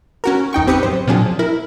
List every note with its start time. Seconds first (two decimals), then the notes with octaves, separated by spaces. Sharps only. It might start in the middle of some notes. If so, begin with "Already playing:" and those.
0.24 C#4 F#4 A#4
0.53 E2 D#4 G5 C#6
0.67 A1 C4 G4 B4 D#6 C#7
0.83 F#2 C5
1.08 A#2 F3 F#3 C4 D4 G#4
1.39 E4 A#4